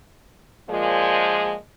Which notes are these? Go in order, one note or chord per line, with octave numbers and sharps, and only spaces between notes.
A#2 F3 G#3